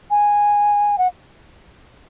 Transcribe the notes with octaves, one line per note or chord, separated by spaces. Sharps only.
G#5
F#5